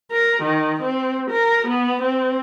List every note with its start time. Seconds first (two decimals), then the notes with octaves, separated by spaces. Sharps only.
0.12 A#4
0.43 D#3
0.82 C4
1.30 A#4
1.67 B3
2.02 C4